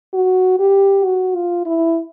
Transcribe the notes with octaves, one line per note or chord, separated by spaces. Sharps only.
F#4
G4
F#4
F4
E4